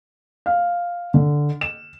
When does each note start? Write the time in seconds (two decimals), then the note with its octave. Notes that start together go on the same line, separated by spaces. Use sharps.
0.46 F5
1.14 D3
1.61 E7